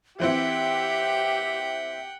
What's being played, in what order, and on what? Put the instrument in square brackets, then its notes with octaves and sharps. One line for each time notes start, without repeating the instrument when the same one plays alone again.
[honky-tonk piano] E3 C4 E4 [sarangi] G4 [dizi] E5 [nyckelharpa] F#5 G5